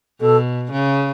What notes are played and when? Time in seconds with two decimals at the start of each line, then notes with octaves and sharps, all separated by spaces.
0.21 B2 A4
0.72 C#3